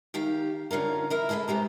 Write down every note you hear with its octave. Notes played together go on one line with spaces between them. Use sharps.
D#3 G4 F5
D3 C#4 F4 A#4
E4 A#4 D#5
G#4 A4 B4 C5 D#5
C3 G#3 G4 A#5